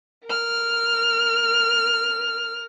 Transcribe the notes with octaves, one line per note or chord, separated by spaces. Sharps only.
A#4 F6